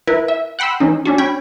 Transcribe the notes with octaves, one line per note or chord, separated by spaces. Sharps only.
E4 A#4 B4
E5
F#5 G5 B5 C6 E6
E3 C#4 D#4
C#4 D4 F#4
C#4 G5 B5 G#6